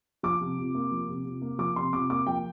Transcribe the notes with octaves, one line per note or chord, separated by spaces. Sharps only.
F3 D6
C3
C3
A#3
F3
C3
C3
A#3
F3 D6
C3 C6
C3 D6
A#3 D6
F3 G5